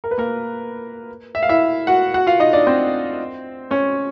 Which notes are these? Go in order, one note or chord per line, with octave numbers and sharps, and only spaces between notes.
A#4
B4
A#3 A#4
E5
F5
E4 E5
F#4 F#5
F#4 F#5
F4 F5
D#4 D#5
D4 D5
C4 C5
C#4 C#5